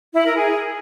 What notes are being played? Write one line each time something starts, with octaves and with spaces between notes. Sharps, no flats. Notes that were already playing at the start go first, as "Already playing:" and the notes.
E4
A#4
G#4